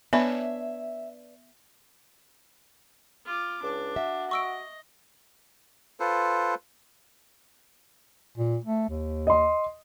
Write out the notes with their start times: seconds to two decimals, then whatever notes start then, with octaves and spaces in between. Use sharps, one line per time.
0.13 B3 D4 B4 C#5 E5
3.25 F4 D6
3.63 C#2 D4
3.96 F#4 E5
4.31 D#5 C#6 E6 D7
6.00 F4 A4 B4 C5
8.37 A#2
8.64 A3
8.90 D#2
9.27 D#5 C6